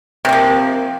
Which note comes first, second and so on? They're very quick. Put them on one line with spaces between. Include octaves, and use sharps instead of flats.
C3 A#3 F3